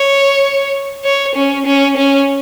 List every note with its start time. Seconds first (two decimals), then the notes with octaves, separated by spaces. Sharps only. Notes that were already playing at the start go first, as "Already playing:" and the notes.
Already playing: C#5
1.04 C#5
1.35 C#4
1.66 C#4
1.97 C#4